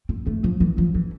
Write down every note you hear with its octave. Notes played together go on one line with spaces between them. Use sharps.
C4
A3
F3
E3
F3
E3